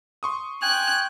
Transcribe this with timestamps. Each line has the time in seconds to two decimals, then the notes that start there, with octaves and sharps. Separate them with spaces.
0.23 C6 C#6 D#6
0.62 G5 G#5 F#6